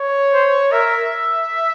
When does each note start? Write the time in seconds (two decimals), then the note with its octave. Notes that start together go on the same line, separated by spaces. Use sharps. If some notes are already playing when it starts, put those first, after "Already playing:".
Already playing: C#5
0.33 C5
0.72 A#4 E5